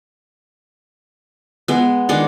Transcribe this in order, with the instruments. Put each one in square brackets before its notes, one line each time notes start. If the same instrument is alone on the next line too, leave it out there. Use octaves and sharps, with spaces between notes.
[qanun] G#3 B3
D#3 G#3 D4 F#5